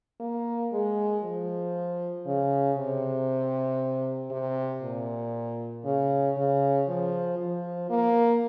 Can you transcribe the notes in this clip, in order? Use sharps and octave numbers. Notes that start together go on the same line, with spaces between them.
A#3
G#3
F3
C#3
C3
C3
A#2
C#3
C#3
F3
F3
A#3